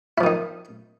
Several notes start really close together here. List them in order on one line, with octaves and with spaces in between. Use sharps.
E4 F3 D#3 D#4